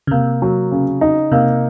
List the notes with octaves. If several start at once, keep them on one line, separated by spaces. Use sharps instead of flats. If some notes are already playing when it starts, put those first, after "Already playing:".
C#3
C3 A#3
F#3
C#3
D#4
C3 A#3